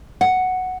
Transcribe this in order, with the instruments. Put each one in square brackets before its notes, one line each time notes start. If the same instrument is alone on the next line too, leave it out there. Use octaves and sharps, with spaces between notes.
[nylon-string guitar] F#5